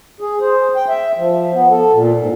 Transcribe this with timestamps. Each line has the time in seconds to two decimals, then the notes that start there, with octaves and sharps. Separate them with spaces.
0.21 G#4
0.41 C5
0.76 G5
0.89 E5
1.18 F3
1.53 B3
1.71 A4
1.93 A#2
2.21 G#2